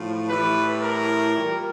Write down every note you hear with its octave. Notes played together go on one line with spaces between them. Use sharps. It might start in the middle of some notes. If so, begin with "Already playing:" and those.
Already playing: A2 F3
A2 E3 G3 B4
A#4
A#2 G3